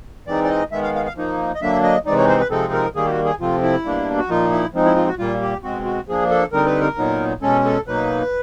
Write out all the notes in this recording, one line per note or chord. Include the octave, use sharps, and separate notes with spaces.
E3 G#3 C4 D#4 D5
D5
D#5
D#3 G#3 B3 E5
F5
F5
F5
F3 A#3 D#4
D#5
D3 F#3 A#3 D4 E5
D#5
C3 E3 G#3 C4 D#4 D5
C#5
C5
B4
C3 F3 G#3 C4 D#4 A4
A#4
D#3 G3 A#3 G#4
G4
F#4
G#4
C3 F3 A3 C4 F4
E4
B2 G3 A#3 D4
F#4
A#2 F3 A#3 D#4 F4
E4
F3 G#3 C4 D#4
E4
F4
F#4
A#2 G3 A#3 F4
G4
B2 G#3 C4 F#4
F#4
F3 A#3 D4 G#4
A4
D3 G3 C4 D#4 A#4
B4
A#4
A#2 F#3 B3 D#4
B2 G#3 C#4 A4
A4
B2 F#3 A#3 D#4 B4